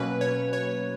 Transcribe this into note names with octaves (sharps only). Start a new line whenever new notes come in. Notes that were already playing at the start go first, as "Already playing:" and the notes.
Already playing: B2 F#3 A#3 C#4 B4
C#5
C#5